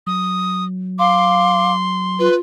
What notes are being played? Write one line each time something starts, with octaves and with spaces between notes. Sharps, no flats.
F#3 D#6
F5 C6 D6
F4 B4